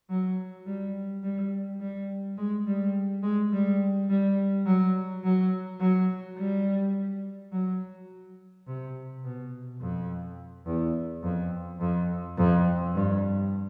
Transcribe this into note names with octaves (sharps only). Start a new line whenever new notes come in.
F#3
G3
G3
G3
G#3
G3
G#3
G3
G3
F#3
F#3
F#3
G3
F#3
C3
B2
F2
E2
F2
F2
F2
G2